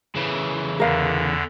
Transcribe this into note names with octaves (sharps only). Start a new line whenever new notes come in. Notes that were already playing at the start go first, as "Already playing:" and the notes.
C#3 E3
E2 D3 A#4 F5